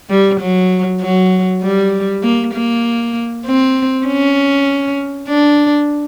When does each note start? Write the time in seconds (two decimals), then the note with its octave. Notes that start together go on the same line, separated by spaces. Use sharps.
0.10 G3
0.40 F#3
1.01 F#3
1.62 G3
2.23 A#3
2.53 A#3
3.46 C4
4.06 C#4
5.28 D4